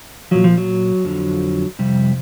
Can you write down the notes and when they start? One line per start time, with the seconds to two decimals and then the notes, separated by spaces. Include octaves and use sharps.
0.31 A#2 F3 F#3
0.44 F3
0.58 F#3
1.05 F2 D3 F3
1.79 F2 C3 G3